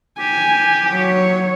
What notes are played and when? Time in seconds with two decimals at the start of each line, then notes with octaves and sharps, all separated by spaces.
0.20 G4 G#5
0.91 F#3 C#5